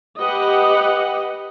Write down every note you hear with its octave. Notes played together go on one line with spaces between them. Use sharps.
G4 B4 D#5 F#5